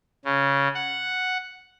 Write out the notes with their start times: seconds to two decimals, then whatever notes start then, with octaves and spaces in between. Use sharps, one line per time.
0.25 C#3
0.74 F#5